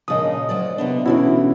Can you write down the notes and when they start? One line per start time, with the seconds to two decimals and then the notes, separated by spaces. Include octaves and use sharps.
0.08 A#2 C#3 F3 D#5 D#6
0.49 D2 F#3 D5
0.78 C3 B3 D4
1.05 B2 D3 E3 C#4 E4 F#4